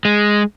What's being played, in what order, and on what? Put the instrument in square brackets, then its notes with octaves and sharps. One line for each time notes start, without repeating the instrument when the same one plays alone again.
[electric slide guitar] G#3